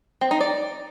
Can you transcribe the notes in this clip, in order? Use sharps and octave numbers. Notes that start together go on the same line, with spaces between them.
C4
D#4
D5